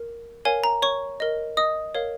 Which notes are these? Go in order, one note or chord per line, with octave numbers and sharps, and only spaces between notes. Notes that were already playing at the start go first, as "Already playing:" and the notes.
Already playing: A#4
A#4 C#5 F5 G#5
A#5
C#5 C#6
A#4 D#5
D#5 D#6
A#4 C#5 F5